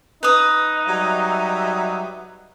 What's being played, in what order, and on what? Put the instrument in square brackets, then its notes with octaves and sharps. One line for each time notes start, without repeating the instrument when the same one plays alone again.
[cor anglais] D#4 [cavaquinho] B4 D#6
[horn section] F#3 G3 E5